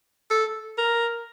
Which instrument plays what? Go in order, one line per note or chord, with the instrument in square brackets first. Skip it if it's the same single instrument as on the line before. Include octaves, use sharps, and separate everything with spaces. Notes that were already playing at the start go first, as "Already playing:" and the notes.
[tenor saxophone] A4
A#4